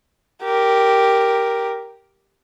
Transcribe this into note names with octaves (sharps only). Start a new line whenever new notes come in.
G4 A#4